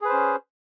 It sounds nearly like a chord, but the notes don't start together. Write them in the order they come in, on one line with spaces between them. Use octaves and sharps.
G#4 B4 C5 C#4